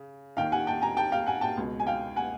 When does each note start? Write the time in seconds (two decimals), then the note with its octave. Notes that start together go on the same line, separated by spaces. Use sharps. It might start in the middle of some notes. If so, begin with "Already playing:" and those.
Already playing: C#3
0.37 D#2 D#3 F5 G5
0.52 F#5 G#5
0.67 G5 A5
0.82 G#5 A#5
0.97 G5 A5
1.12 F5 G5
1.26 F#5 G#5
1.41 G5 A5
1.57 C#2 B2
1.80 G#5
1.87 F5 G5
2.16 F#5 G#5